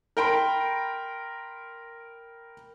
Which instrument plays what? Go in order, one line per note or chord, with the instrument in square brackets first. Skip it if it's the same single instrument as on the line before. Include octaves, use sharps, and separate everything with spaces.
[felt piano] A#4 G5 B5 C6